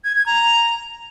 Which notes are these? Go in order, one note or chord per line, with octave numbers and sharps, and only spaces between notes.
G#6
G#6
A#5